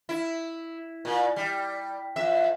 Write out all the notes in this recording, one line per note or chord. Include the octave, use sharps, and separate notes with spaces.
E4
A#2
G3
F2 E5